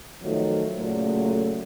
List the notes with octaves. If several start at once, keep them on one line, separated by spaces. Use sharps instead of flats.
B2 D#3 F3 F#3 A3
A#2 C#3 F#3 A3